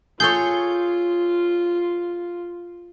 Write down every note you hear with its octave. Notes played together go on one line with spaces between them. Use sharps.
F4 G#4 A4 C#5 G6